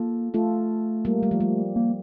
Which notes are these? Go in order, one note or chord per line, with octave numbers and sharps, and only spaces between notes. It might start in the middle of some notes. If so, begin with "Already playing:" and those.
Already playing: A#3 F4 A4
A3 F4 A4
G3 A#3
G3
F3
G3
A#3